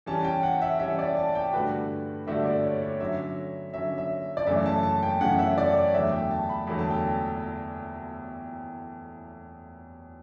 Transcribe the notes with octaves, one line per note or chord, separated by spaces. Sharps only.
E3 G3 C#4 A5
G5
F#5
E5
E3 G3 C#4 E5
D5
A5
G5
G2 D3 A3 D4 F#4 B4
G2 D3 A3 D4 F#4 E5
D5
C#5
C#5
D3 F#3 C#4 E5
D3 F#3 C#4 E5
E5
D5
F#2 C#3 E3 A3 C#4 E5
A5
A5
G5
F#2 C#3 E3 A3 C#4 F#5
E5
D5
C#5
E2 D3 F#3 A3 E5
G5
A5
B5
E2 D3 F#3 A3 B5
A5
G5
A5